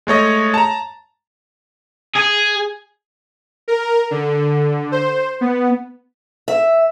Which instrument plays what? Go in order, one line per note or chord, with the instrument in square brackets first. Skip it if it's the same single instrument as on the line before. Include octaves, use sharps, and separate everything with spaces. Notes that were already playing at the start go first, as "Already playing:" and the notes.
[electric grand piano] G#3 A3 C#5 D#5
A5 A#5
[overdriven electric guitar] G#4
[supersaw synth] A#4
D3
C5
B3
[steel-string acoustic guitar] E5